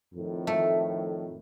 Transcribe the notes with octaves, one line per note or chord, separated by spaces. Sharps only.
F2 A2 D#3
A3